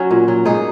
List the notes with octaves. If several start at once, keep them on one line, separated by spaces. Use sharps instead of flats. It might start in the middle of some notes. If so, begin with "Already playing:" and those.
Already playing: F#3 C#4 F#4
A#2
F#3
G#2 D#4 G#4